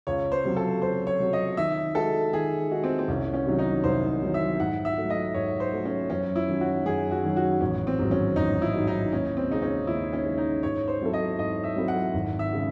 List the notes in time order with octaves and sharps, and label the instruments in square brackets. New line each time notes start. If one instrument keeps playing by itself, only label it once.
[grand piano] C#2 [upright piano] C#5
[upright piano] C5
[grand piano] C3 F#3 C4
[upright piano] A4
[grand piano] C#2 [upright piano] C5
[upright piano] C#5
[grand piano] C3 F#3 C4
[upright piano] D#5
[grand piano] D#3 [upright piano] E5
[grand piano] G#3 D#4 F#4 [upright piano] A4
[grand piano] D#3 [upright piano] G#4
[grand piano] G#3 D#4 F#4
[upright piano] C4
C4
[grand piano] C2 [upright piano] C#4
[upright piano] C#4
[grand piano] C3 D#3 F#3
[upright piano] D#4
[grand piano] C2 [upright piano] C5
[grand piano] C3 D#3 F#3
[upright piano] E5
[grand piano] G#2 [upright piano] F#5
[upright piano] E5
[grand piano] F#3 A3
[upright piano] D#5
[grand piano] G#2 [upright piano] C#5
[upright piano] C5
[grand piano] F#3 A3
[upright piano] C#4
[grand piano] F#2 [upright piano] C#4
[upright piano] E4
[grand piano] D#3 F#3 C#4
[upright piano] F#4
[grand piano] F#2 [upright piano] G#4
[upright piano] F#4
[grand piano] D#3 F#3 C#4
[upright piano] F#4
[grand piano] A1 [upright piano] C#4
[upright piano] C4
[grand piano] G#2 D#3 F#3
[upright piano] C#4
[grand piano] A1 [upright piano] D#4
[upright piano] E4
[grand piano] G#2 D#3 F#3
[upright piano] D#4
[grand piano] D#2 [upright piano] C#4
[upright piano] C4
[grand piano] C#3 G#3 [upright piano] D#4
[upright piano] C#4
[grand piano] D#2 [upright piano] E4
[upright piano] C#4
[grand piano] C#3 G#3
[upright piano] D#4
[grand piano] G#2 [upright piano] C#5
[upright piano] C5
[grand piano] F#3 C4 E4 A4
[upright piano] D#5
[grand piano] G#2 [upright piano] D#5
[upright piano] E5
[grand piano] F#3 C4 E4 A4
[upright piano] F#5
[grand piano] G#1
[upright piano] E5
[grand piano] C#3 G#3